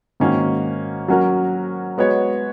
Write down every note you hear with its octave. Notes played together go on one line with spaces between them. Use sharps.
G#2 D#3 A#3 C#4 F#4
F#3 C#4 F#4 A#4
G#3 B3 F#4 C#5